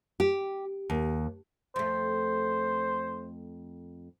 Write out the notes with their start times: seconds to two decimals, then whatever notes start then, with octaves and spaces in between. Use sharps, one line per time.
0.20 G4
0.90 D#2
1.76 F2 A3 C5